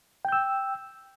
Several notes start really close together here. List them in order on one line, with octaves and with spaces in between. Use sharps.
G5 G6 E6